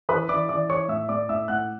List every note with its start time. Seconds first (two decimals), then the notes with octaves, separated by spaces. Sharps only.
0.09 E3 B4 B5
0.29 E3 D5 D6
0.49 E3 D5 D6
0.69 E3 C#5 C#6
0.88 A2 E5 E6
1.08 A2 D5 D6
1.29 A2 E5 E6
1.48 A2 F#5 F#6